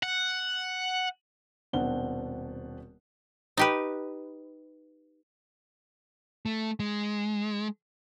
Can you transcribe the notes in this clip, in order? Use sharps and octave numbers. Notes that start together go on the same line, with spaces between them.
F#5
D#1 B2 C4 D4 F#5 G7
D#4 G4 B4
A3
G#3